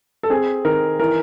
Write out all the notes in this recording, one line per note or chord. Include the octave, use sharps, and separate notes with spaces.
A4
C4 G#4
D#3 A#4
E3 A#4